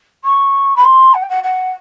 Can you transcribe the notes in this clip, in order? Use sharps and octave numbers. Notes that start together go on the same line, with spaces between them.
C#6
B5
C6
F#5
G5
F#5
F#5